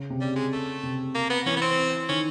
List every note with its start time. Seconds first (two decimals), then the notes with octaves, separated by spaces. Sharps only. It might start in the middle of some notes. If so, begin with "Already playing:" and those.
Already playing: C#3
0.10 C3
0.20 C#3 G3
0.36 G#3
0.52 A3
0.83 C3
1.15 A#3
1.30 B3
1.46 E3 C#4
1.56 B3
1.61 C4
2.09 D#3 C#4